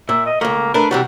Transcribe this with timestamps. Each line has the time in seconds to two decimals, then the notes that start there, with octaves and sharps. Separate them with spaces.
0.09 A#2 E5
0.26 D#5
0.41 C#2 A3 A#3
0.74 A3 D4 A#4 B4
0.91 C3 E3 G3 F#4